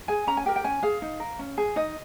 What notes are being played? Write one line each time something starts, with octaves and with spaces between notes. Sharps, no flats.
G#4 G#5
C#4 A#5
G#5
G4 A#4 G5
G5
C#4 G#5
G#4 F5
D#4
A#4
C#4
G#4
D#4 D#5